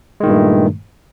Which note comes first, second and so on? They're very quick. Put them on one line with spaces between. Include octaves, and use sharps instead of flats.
G#3 D#3 A#2 G2 A3